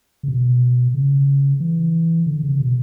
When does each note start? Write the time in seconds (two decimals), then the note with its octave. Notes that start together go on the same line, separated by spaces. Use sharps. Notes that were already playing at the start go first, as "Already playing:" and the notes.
0.23 C#3
0.28 B2
0.94 C#3
1.60 E3
2.26 D3
2.43 C#3
2.60 B2